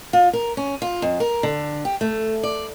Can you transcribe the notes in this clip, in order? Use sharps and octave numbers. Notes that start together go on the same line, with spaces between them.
F4
A#4
C#4
F4
F2
A#4
D3
G4
A3
D5